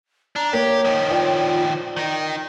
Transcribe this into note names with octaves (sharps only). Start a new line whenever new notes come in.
D4 A#5
A#3 G4 C#5
D#3 F3
F4 C#5 D5 G5
D#3 D#4